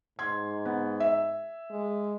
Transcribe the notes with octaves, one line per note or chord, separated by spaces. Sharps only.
G#2 C6 G#6
B3
E5
G#3